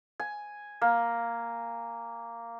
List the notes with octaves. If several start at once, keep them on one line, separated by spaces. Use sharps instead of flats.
G#5
A#3